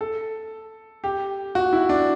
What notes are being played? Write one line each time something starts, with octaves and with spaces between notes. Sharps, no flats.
A4
G4
F#4
E4
D4